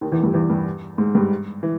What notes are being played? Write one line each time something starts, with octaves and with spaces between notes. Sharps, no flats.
D#2 D#3
E2 E3
G2 G3
E2 E3
G2 G3
G#2 G#3
G2 G3
E3